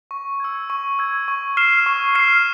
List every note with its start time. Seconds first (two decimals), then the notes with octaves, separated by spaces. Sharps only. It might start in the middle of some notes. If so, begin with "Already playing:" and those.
0.11 C#6
0.40 E6 G#6
0.70 C#6
0.99 E6 G#6
1.28 C#6
1.57 F6 C7 E7
1.86 C#6
2.15 F6 C7 E7